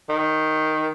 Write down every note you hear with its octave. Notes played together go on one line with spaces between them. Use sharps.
D#3